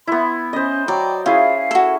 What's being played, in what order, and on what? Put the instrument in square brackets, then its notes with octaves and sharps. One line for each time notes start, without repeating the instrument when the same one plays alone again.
[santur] B3 E4 [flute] C6
[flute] C#4 [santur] C5 D#5
[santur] F#3 [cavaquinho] D5 [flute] G5
[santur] C#4 E4 G#4 [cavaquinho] F4 [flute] F5
[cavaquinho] F#4 A4